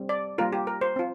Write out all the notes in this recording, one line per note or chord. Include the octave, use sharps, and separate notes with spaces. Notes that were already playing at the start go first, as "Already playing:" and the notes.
Already playing: G3 C4
D5
G3 A#3 F4 A#4
G4
A#4
C5
C4 F4